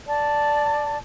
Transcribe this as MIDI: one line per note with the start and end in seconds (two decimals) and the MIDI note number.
0.06 0.98 74
0.06 0.98 81